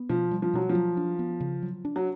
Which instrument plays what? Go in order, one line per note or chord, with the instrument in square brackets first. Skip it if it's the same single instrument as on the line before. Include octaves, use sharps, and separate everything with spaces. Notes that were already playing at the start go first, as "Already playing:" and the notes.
Already playing: [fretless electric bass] B3
[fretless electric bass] B2 [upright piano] F3
[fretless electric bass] G3
[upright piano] F3
[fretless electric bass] B2 [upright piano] F#3
[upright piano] F3
[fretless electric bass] F#3
D4
B3
C#3
F#3
D4
[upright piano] F#3